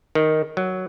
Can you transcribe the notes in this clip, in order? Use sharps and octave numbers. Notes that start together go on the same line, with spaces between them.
D#3
F#3